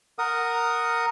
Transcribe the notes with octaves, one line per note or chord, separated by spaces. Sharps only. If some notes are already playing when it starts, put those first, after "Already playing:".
A#4 F#5 D#6